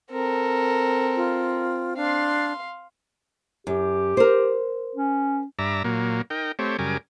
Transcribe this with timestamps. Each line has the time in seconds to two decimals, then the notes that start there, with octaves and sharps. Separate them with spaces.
0.11 C4 A4 A#4
1.16 F4
1.97 D4 F5 C6
3.67 F#2 G4
4.17 A#4 C5
4.95 C#4
5.59 G2 D5 E5 A#5
5.84 A#2 F#3 A#3
6.30 D#4 A#4 G5
6.59 A3 C4 G4 C#5
6.79 F#2 C#3 G3 G#4 A#4 D6